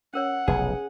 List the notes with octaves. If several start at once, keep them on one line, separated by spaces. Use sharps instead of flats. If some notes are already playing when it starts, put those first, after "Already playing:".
C#4 A#4 C#5 F#5
F1 B1 G#4 B4